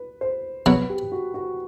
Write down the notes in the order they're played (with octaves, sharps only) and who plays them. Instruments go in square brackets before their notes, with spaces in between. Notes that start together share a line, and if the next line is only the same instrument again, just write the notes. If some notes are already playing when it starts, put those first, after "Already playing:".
Already playing: [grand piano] B4
C5
[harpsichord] B2 F#3 B3 [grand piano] B4
[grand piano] G4
F#4
F#4